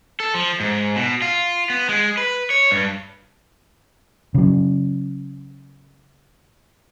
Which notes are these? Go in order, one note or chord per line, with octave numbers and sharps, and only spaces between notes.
A4
F3
G#2
B2
F4
B3
G#3
B4
C#5
G2
C#3 F#3